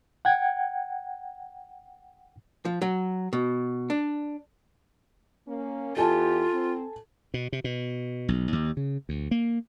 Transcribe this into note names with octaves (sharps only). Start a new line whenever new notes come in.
F#5 G5 G#6
F3
F#3
B2
D4
A#3 C#4
E2 F4 G4 A4 G#5 A5
C4
B2
C3
B2
B1
D#2
C#3
D2
A#3